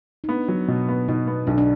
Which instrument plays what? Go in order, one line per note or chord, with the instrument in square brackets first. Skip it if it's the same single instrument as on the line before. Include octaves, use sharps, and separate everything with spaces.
[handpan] D#4
[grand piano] B3 [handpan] D4
[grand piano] F#3
B2
B3
[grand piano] B2 [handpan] D#4
[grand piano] B3
[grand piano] B1 [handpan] D4
[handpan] D4